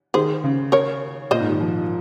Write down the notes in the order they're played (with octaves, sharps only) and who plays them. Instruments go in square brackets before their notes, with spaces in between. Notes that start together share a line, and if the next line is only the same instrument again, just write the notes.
[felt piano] D#3 [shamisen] G#4 C5
[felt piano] C#3
[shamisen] A#4 C#5
[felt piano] A#2 [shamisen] C5 D#5
[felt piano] G#2
D#3
F3